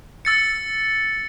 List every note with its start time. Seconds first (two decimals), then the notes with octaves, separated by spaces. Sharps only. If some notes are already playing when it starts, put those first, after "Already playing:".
0.25 E6 A6 C#7